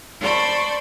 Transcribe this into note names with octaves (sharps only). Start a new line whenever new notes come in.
C5 D5 A5 B5 C#6